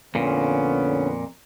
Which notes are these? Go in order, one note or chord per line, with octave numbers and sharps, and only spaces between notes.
F2 A#2 D3 B3 C#4